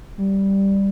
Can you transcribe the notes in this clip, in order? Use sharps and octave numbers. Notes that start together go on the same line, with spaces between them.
G3